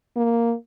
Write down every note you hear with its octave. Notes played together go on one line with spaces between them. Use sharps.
A#3